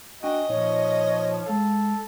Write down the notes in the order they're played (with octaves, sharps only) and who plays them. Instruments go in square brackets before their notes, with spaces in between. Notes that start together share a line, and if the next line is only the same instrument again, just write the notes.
[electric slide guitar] D4 G5 G#5 [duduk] F#4 [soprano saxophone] D#5
[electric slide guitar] A#2 D#4 [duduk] F3 [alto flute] C#5
[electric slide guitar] G#3 F5 [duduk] A4